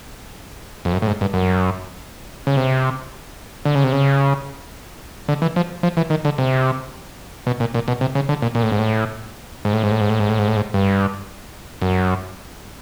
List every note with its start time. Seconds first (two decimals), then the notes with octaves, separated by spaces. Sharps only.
0.85 F2
0.93 F#2
1.02 A2
1.07 G#2
1.21 G2
1.34 F#2
2.47 C#3
2.57 C3
3.65 D3
3.75 C#3
3.84 C3
3.93 C#3
5.29 D3
5.42 E3
5.56 F3
5.83 F3
5.97 E3
6.10 D#3
6.25 D3
6.38 C3
7.47 B2
7.60 A#2
7.74 A#2
7.88 B2
8.01 C3
8.15 C#3
8.29 D3
8.42 A#2
8.55 A#2
8.63 A2
8.72 G#2
8.79 A2
9.65 G#2
9.73 A2
9.83 G#2
9.91 A2
10.01 G#2
10.10 A2
10.20 G#2
10.29 A2
10.39 G#2
10.48 A2
10.56 G#2
10.74 G2
11.82 F#2